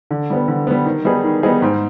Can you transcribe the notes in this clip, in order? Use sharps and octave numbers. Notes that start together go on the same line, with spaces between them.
D3
G3 B3
D3
G3 B3
D#3
G3 B3 D#4 G#4
D#3
G3 B3 D#4 G#4
G#2